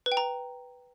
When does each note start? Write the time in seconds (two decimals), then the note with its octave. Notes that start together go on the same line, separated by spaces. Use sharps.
0.06 B4
0.12 G5
0.17 A#5